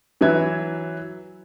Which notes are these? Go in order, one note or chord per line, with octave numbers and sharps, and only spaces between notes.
E3 F#3 B4 E5 G#6